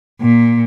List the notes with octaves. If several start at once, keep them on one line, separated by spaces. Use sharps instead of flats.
A#2